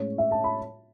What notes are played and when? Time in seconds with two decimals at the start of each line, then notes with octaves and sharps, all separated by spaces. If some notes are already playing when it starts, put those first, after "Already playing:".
Already playing: A2 G#3 C#4 C#5
0.18 E5
0.31 A5
0.44 B5